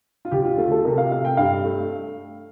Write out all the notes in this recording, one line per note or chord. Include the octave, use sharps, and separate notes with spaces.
F4
D2 G4
F4
A3 F4
A4
C3 A#4
F5
A3 F5
G5
G2 F5
A3